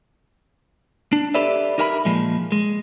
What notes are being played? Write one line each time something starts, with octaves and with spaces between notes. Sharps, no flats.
D4
G4 A4 B4 D5 E5
D#4 G4 A#4 E5 A5 B5
A#2 F3 G#3
G#3